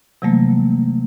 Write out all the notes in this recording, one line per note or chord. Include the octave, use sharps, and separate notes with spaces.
C3 E3 F#3 G3 A3 A#3